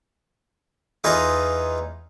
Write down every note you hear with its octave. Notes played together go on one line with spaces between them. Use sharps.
E2 D#4 F4 G#4 B4 A#5